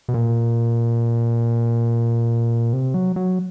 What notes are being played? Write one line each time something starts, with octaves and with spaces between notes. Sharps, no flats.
B2
A#2
C3
F#3
F#3